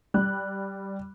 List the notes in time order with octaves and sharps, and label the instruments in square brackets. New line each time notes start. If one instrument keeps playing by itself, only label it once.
[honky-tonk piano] G3 F#6